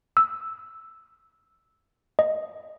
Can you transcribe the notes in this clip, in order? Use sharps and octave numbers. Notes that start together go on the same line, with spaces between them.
E6
D#5